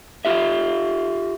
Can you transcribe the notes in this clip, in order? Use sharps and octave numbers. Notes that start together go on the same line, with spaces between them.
F4 G4 E5